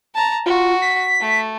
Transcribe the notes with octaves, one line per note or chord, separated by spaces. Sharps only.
A5 A#5
F4 F#4
B6
A3